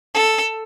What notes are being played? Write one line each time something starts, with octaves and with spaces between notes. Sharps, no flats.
A4